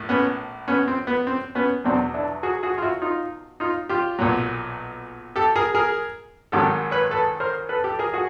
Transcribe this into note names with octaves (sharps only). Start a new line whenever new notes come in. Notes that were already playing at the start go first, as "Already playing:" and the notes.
Already playing: A#1 A2
B3 C#4
B3 C#4
C4
B3
C4
B3 C#4
E2 B2 F#3 C4 D4
D4 E4
F#4 G#4
F#4 G#4
F4
E4 F#4
D#4 F4
D#4 F4
F4 G4
B1 A#2 F#3
G4 A4
G#4 A#4
G#4 A#4
G#1 G#2 D#3 F#3 G4 A4
B4 C#5
A4 B4
A#4 C5
A4 B4
G4 A4
G#4 A#4
F#4 G#4